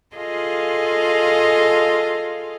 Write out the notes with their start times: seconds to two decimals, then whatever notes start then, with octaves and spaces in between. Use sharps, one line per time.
0.17 F4 G#4 A4 D#5 F5